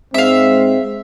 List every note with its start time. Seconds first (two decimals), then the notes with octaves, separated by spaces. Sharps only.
0.14 G#2 G#3 C4 E5 F5